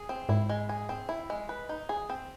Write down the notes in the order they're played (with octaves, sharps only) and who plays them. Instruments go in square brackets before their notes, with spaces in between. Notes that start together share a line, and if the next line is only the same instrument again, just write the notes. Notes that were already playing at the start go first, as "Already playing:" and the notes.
Already playing: [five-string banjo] G#4
C4
[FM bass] G#2 [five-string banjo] E4
[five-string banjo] G#3
G#4
C4
E4
G#3
B4
D#4
G#4
C4